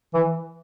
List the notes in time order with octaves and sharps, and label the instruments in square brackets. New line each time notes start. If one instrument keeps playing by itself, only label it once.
[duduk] E3